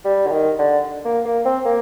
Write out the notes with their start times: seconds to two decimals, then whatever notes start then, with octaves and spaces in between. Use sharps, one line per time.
0.05 G3
0.27 D3
0.32 D#3
0.59 D3
1.05 A#3
1.25 A#3
1.45 C4
1.66 A#3